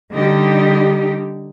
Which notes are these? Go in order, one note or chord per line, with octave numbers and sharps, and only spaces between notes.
D3 G3 D#4 G4